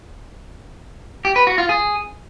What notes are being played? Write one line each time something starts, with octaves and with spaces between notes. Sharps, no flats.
G4
B4
F#4
F4
G#4